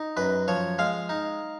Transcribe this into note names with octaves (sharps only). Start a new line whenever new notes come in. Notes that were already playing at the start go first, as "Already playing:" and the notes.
Already playing: D#4
F#2 B4
F3 C#5
G#3 F5
D#4